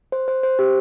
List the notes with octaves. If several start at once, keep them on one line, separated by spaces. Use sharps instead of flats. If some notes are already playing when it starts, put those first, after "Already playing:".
C5
C5
C5
G4